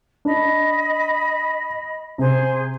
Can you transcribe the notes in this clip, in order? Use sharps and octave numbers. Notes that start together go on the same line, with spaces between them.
D4 D#5 B5
C3 G#4 C5